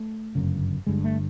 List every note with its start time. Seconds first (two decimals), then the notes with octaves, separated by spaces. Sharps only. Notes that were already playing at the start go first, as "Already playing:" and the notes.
Already playing: A3
0.35 G1 F#2 C#3
0.87 G1 G2 D3 G#3
1.04 A3